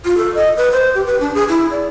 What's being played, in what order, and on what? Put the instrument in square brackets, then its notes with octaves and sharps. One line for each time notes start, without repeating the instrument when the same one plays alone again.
[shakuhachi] F4
A4
D#5
B4
C5
G4
B4
D4
G#4
E4
D5